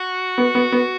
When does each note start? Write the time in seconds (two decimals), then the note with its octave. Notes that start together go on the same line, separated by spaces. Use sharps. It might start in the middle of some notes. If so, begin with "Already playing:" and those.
Already playing: F#4
0.38 B3
0.55 B3
0.72 B3